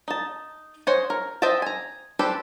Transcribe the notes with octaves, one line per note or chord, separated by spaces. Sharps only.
D#4 A5
C5 C#5 D#5 F#5 G#5
A#4
C5 D#5 E5 G5 A5
G#5 A#5
D4 G4 A4 B4 C5